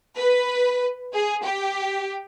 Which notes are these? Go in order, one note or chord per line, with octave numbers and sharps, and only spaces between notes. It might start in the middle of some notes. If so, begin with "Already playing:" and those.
B4
G#4
G4